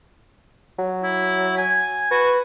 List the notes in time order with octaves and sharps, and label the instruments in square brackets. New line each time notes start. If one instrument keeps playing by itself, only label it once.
[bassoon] F#3
[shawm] E4
G#5
[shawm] F#4 [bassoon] B4